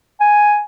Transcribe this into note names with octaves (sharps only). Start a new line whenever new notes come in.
G#5